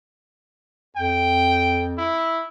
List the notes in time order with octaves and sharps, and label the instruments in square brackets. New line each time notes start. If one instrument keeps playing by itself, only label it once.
[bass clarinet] F2 [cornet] G5
[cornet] E4